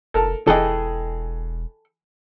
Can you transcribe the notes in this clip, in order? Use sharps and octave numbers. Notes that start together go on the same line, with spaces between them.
F1 A4 A#4 A5
E1 E3 G#4 A4 D#5 G5